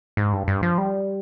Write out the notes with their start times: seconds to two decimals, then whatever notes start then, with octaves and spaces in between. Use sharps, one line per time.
0.17 G#2
0.33 G2
0.48 G2
0.63 F3
0.78 G3